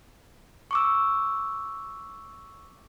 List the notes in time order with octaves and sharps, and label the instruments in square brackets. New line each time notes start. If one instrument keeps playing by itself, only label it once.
[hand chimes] C#6 D6 E6